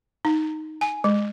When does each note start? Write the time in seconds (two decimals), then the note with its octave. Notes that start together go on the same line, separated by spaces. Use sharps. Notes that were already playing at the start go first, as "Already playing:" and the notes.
0.25 D#4
0.81 G#5
1.04 G#3